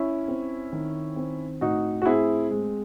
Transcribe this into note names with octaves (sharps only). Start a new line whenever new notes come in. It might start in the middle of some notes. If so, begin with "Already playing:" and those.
Already playing: C#4 E4
C4
D#3
C4
A2 D#4 F#4
F#4
C4 E4 G#4
G#3